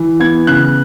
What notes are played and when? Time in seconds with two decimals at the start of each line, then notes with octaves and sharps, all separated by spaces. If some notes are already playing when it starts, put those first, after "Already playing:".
Already playing: E3
0.20 B3 G#6
0.47 C#3 F#6